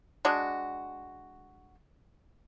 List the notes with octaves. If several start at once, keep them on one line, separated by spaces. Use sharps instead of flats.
G#3 D4 F#4